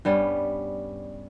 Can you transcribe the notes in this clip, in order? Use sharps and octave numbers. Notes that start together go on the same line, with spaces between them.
G2 G3 B3 C#4